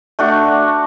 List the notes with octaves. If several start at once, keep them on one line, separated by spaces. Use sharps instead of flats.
A3 D4 F#4